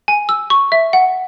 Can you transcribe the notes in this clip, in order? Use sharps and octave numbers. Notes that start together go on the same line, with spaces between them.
G#5
E6
C#6
E5
F#5